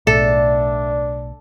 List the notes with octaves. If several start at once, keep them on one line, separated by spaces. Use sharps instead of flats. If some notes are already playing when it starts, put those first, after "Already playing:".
B1 A2 D4 A4 D5 E5